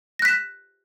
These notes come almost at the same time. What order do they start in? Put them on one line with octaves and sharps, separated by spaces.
A#6 F#6 B6 E7